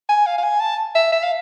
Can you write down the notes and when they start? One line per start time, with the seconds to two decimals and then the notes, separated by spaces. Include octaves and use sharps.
0.09 G#5
0.26 F5
0.38 F5
0.43 G#5
0.60 A5
0.95 E5
1.12 E5
1.24 F5